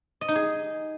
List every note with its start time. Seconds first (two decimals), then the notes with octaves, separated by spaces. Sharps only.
0.21 D#5
0.28 D#4
0.35 G#4